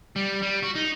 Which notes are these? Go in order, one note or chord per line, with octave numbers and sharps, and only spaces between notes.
G3
G3
F#4
D#4